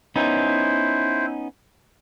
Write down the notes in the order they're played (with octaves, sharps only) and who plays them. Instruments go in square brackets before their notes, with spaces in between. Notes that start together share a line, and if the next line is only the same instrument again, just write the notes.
[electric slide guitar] B3 C#4 D#4 [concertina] E4 C5